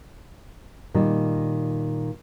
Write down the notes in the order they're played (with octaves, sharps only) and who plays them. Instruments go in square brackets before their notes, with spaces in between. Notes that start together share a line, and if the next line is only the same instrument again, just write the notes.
[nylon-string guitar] A#2 D#3 G3